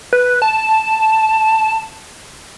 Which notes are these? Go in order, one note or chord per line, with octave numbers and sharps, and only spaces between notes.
B4
A5